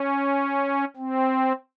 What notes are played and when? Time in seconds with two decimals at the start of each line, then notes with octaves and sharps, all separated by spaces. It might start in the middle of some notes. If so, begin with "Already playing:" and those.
Already playing: C#4
0.97 C4